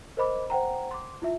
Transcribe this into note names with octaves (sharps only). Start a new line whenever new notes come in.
A#4 C5 D#5 B5 D6
C5 F#5 G5 A#5
C6 D6
E4 F4 E5